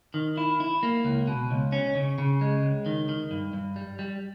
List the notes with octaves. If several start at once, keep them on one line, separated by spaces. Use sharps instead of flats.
D#3
E4
E4
A#3
C#2
B2
C#2
C#4
C#3
C#3
G#3
C#2
D#3
D#3
G2
G2
G3
G3